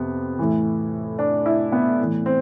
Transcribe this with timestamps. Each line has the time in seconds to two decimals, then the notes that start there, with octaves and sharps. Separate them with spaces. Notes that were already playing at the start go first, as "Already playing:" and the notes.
Already playing: F2 C3 B3
0.39 A2 E3
1.19 D4
1.46 E4
1.72 B3
1.99 A2 E3
2.26 C4